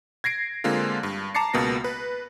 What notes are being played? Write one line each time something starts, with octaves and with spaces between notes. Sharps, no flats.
G#6 A#6 C7 D7
D3 G#3 A#3 C4 F4
G2
A5 A#5 D6 A6 C7 C#7
C#2 B2 A#3 B3 A#6
B4